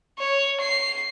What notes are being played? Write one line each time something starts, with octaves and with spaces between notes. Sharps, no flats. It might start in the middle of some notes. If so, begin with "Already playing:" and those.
C#5
C7